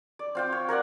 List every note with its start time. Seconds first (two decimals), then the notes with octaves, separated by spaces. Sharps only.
0.19 D5
0.35 C4 F4 G5
0.52 C#5
0.69 A#4 C#5 D5 F#5